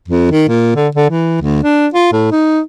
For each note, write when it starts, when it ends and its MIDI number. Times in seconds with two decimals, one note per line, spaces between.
0.09 0.27 41
0.31 0.45 51
0.48 0.74 46
0.76 0.88 50
0.95 1.08 50
1.09 1.40 52
1.42 1.59 38
1.63 1.87 62
1.94 2.09 65
2.12 2.29 45
2.32 2.61 63